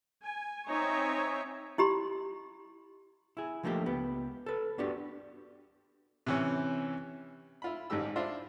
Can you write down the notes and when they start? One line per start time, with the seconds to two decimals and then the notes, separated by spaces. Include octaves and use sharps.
0.24 G#5
0.68 C4 D#4 C#5 E5 G#5
1.78 E4 G4 B5 C6
3.37 E4 G#4
3.63 D3 F3 A3 A#3 D#4 G4
3.86 C#2 B3 G4
4.46 A4 B4
4.78 B3 D4 F#4 G4
6.26 C3 E3 C#4
7.62 E4 F4 B5
7.90 A1 G#2 G#3 G4 E6
8.16 D4 E4 F4 C5